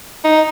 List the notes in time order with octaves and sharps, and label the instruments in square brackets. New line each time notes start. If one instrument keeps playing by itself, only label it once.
[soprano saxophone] D#4